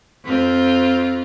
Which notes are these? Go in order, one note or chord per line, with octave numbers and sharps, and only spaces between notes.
F2 C4 F4